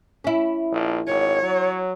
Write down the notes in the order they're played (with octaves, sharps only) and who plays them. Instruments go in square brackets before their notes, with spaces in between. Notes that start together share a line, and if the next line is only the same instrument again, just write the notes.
[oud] C#4 E4
[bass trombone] A#1
[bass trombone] G#1 [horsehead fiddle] C#5
[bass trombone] F#3